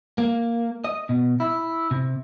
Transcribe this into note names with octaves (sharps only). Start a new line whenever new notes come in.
A#3
D#5
B2
E4
C3